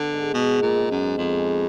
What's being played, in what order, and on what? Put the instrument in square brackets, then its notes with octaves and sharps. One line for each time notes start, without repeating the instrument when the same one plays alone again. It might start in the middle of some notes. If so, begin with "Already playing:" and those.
Already playing: [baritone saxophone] D3 [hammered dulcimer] B3
[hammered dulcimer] G#2
[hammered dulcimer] G#2 [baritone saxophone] B2
[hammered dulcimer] G#2
[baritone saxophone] A#2
[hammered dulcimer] G#2
[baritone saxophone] F#2
[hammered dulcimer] B3
[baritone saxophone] F2 [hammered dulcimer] G#3
[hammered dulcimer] G#3